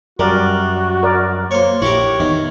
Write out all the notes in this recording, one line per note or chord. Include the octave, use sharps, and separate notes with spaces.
F#2 G3 F#4 A#4 D5
A#4 D5
A#3 C5 C#5
A#1 E4 F#4 G4 A#4 C#5
E2 D#3